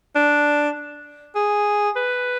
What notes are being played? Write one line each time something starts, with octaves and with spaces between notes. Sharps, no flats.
D4
G#4
B4